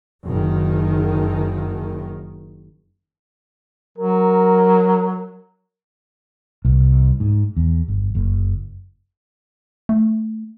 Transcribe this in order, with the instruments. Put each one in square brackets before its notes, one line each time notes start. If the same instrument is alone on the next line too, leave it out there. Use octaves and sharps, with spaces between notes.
[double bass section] F#1 D#3
[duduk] F#3 [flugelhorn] A#4
[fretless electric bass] C2
G#2
E2
G1
F#1
[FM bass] A3